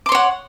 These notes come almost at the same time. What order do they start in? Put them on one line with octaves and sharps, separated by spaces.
D6 C6 C#5 F#5